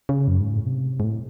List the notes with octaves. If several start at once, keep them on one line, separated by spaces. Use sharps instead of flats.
C#3
F#2
G#2
A2
C3
G#2
A2